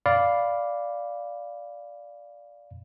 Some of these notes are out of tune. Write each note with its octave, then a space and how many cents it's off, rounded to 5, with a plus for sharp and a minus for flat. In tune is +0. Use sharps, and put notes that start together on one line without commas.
D5 -5 F5 +0 B5 +0